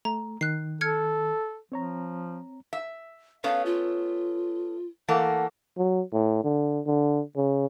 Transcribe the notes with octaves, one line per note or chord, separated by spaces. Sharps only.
A3 A#5
D#3 F#6 C7
A4 F6 G#6 C#7
F3 C4 C#5 A#5
E5
A3 B3 C#4 F5
F4
E3 A3 A#3 F#5
F#3
A2
D3
D3
C#3